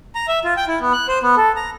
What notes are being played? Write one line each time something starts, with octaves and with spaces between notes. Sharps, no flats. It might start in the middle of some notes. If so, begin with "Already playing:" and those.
A#5
E5
F4
G5
E4
B3
F#6
C5
B3
A4
A#5